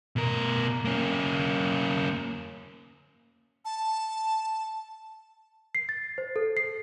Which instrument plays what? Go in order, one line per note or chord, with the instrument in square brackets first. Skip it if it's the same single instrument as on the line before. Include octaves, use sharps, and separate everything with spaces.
[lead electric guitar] B2 A#4
A#3 C#4
[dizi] A5
[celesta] C7
A6
C5
A4
C7